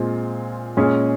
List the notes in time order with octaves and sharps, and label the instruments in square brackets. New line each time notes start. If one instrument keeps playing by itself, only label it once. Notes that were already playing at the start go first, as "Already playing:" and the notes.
Already playing: [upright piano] A#2 G#3 C4 F4
A#2 G#3 C#4 G#4